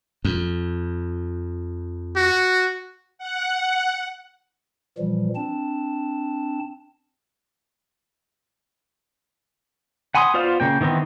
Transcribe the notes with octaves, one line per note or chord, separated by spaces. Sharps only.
F2
F#4
F#5
A#2 E3 F3 G3
C4 D4 A5
F#5 G#5 B5 C6 D#6
B3 F4 C5 D5 F5
C#3 A#3 G5
D#3 E3 B3 C4 E4